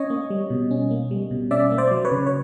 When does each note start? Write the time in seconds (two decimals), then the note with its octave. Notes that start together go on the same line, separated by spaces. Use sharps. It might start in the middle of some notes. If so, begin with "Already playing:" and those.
Already playing: C#4 C#5 D#5
0.10 A#3
0.30 G3
0.50 B2
0.71 C#4
0.91 A#3
1.11 G3
1.31 B2
1.51 C#4 D5 E5
1.72 A#3
1.78 C5 D5
1.91 F#3
2.05 B4 C#5
2.11 C#3
2.27 C#5